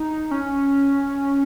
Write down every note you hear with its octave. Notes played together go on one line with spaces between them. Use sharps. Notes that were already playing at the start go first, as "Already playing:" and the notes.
Already playing: D#4
C#4